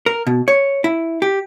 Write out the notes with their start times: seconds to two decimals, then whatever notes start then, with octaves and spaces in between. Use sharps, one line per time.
0.06 A#4
0.27 B2
0.48 C#5
0.84 E4
1.22 G4